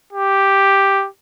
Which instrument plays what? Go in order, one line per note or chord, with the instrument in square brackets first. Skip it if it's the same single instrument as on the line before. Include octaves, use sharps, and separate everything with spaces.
[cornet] G4